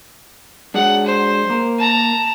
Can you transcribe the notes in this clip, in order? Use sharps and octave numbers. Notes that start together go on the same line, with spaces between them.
F#3 G#3 D4 F#5
C5
A#3 A#4
A5 A#5